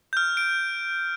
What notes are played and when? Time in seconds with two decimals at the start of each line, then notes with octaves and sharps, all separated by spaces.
0.13 F6 G6
0.37 D7